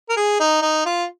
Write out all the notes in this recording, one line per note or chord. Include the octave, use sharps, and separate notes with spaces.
A#4
G#4
D#4
D#4
F4